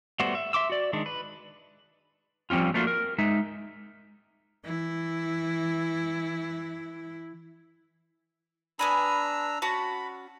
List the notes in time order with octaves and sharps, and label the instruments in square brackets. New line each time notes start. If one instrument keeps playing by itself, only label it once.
[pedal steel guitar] G3 A3 B3 F#4 C5
E5
E5 C6 D6 E6
F#4 D5
D#3 G#3 D4
B4
[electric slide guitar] F3 G3 C4 C#4 F4
A3 A#3 C#4 D4 F4 F#4
A#4
G#3 D#4 E5
[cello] E3 E4
[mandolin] B3 G#5 B5 [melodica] D4 A#5 E6
[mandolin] C#4 F#4 A5 [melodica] B5